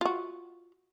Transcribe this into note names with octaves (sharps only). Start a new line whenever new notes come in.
F4 F#4